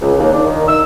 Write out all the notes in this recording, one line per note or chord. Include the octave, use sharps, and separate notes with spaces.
C#2
D#2
D4
D#3
E6